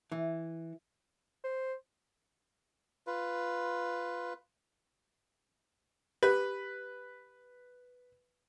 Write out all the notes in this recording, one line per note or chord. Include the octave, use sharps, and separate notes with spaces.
E3
C5
F4 B4
G4 B4